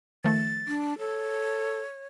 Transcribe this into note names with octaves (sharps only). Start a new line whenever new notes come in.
D#3 F3 A3 A6
D4
A4 C#5